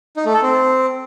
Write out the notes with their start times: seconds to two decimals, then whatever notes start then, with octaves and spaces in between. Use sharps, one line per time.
0.17 D#4
0.25 A3
0.34 A4
0.42 C4